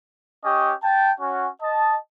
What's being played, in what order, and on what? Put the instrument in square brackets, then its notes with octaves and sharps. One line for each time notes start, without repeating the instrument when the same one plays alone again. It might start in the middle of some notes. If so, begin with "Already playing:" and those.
[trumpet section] C#4 G4 C#5 D#5
G5 A5
C#4 F#4
D#5 A5